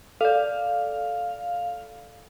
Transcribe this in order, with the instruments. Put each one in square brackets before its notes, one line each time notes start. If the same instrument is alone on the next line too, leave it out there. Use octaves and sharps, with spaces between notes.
[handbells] A4 D5 [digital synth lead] F5